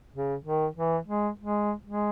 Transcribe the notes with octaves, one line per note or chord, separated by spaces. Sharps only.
C#3
D#3
E3
G#3
G#3
G#3